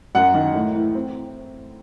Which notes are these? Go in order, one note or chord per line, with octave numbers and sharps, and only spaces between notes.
F#2 F#5
D#3
A2
E3
C4